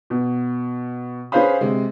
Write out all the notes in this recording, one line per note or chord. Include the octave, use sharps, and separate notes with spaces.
B2
C#4 G#4 B4 C5 F5 B5
C3 G#3